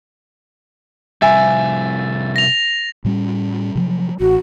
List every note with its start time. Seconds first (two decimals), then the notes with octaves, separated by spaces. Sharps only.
1.22 C3 F3 G3 E5 G#5 A6
2.36 A#6 F7
3.05 A2 G3 C#4
3.75 C3 F3 F#3
4.20 A1 F#4